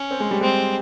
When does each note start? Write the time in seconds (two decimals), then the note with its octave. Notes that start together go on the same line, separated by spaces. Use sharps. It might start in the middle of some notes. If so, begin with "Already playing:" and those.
Already playing: C#4
0.11 C4
0.20 G#3
0.31 G3
0.41 G#3 C4